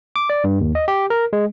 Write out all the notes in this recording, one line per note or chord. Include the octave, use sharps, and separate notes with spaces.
D6
D5
G2
D#2
D#5
G4
A#4
G#3